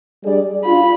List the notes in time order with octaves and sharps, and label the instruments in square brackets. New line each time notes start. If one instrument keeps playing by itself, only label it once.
[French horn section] G3 D4 G#4 D5
[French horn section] D4 F4 [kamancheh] B5